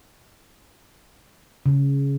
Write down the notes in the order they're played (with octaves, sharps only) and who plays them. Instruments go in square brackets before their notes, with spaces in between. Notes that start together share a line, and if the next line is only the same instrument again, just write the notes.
[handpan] C#3